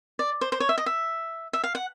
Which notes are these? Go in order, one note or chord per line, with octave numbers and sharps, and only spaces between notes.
D5
C5
C5
C#5
E5
D#5
E5
E5
F5
F#5